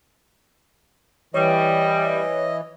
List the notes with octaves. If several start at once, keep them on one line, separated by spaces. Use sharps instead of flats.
E3 G3 C#5 D#5